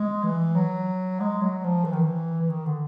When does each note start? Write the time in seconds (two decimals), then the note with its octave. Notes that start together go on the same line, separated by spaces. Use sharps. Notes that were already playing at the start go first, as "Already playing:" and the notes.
Already playing: G#3
0.23 E3
0.56 F#3
1.20 G#3
1.41 F#3
1.64 F3
1.85 E3
1.93 D#3
2.02 E3
2.41 E3
2.50 D#3
2.66 D3